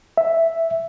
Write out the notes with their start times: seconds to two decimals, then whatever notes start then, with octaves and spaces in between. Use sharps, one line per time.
0.17 E5